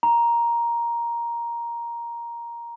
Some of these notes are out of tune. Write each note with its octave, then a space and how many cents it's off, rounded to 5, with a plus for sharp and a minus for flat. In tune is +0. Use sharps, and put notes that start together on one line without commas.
A#5 +10